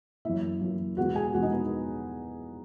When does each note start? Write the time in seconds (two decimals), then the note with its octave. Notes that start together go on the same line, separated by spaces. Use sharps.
0.25 F#2 E3 A#3 E4 E5
0.61 F#2 E3 A#3
0.97 E2 B2 G#3 B3 F#4 F#5
1.15 G#4 G#5
1.33 E2 B2 G#3 B3 F#4 F#5
1.42 D#4 D#5
1.52 B3 B4